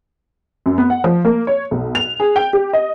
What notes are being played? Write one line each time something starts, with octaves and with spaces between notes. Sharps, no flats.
F#2
B3
F#5
F3
A#3
C#5
B1
F7
G#4
G5
G4
D#5